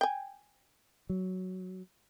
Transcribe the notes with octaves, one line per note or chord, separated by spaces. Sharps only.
G5 G#5
F#3